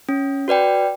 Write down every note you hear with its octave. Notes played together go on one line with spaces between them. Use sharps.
C#4
F#4 B4 D5 G5